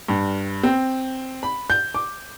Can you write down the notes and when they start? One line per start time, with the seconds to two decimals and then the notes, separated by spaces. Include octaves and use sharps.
0.08 G2
0.63 C4
1.43 B5
1.70 G6
1.95 D6